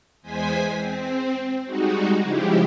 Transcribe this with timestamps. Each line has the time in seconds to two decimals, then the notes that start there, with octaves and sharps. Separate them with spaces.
0.22 E2 G#3 C5 G#5 B6
0.76 C4
1.64 G3 G#3 D#4 F#4
2.22 C#3 F3 G#3 E4 G4